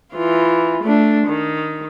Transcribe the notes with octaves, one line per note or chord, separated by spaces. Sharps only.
E3 F4
A3 D4
D#3